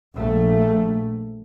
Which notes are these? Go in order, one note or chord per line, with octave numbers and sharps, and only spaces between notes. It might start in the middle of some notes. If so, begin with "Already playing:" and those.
A#1 A3